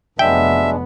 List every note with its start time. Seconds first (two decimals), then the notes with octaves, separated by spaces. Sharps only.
0.19 F1 F#3 G#3 B3 D4 E5 G5